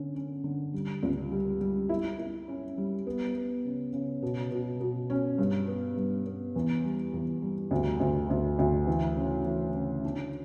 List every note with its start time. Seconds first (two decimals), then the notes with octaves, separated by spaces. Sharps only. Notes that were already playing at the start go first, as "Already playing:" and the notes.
Already playing: D3 C#4
0.15 C#4
0.44 D3
0.74 G3
1.03 C#2
1.31 G3
1.61 G3
1.89 E4
2.19 E4
2.48 C#4
2.78 G3
3.07 B3
3.35 B3
3.65 C#3
3.93 C#3
4.22 B2
4.51 B2
4.80 B2
5.10 C#4
5.38 G2
5.68 B3
5.97 G2
6.27 B3
6.56 E2
6.84 G3
7.14 E2
7.42 G3
7.71 D2
8.00 D2
8.30 D2
8.59 D2
8.87 E3
9.17 C#3
9.46 E3
9.75 C#3
10.05 D4